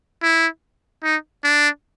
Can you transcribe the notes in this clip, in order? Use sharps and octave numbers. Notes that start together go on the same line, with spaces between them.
E4
D#4
D4